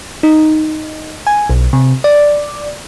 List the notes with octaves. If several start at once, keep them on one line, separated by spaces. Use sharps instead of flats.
D#4
G#5
B1
C3
D5